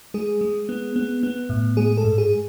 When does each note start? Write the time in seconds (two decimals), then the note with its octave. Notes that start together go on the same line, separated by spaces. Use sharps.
0.14 G#3 G#4
0.41 G#3
0.69 B3
0.96 B3
1.23 B3
1.49 A2
1.77 G#3 G#4
1.97 A4
2.04 G#2
2.18 G#4